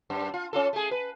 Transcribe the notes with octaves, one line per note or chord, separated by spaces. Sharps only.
F#2
F4
C#4 F4 A4
A3 G#4
B4